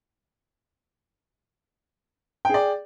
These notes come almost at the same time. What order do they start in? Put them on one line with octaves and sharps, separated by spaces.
G5 G#4 D5